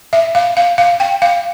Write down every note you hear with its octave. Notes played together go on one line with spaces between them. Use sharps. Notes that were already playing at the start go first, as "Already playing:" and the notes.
E5
F5
F5
F5
G5
F5